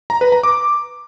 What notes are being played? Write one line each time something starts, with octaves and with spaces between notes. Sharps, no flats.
A#5
B4
A#5
D6